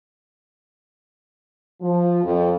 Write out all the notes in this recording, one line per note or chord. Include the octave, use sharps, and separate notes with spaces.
F3
F2